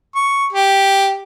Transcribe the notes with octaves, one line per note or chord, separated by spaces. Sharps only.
C#6
G4